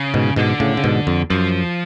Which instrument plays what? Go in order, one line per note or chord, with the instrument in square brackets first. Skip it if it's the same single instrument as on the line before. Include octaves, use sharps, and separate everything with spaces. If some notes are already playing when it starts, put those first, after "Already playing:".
Already playing: [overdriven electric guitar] C#3
[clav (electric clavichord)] G#2 B2
[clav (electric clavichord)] G#2 B2 [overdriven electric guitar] D3
[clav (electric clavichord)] A2 C#3
C#3
G#2 B2
F2
[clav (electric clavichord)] F#2 [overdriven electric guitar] F3